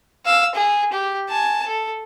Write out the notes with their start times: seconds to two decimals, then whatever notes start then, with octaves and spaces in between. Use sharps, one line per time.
0.25 F5 E6
0.55 G#4
0.93 G4
1.29 G#5 A5
1.67 A4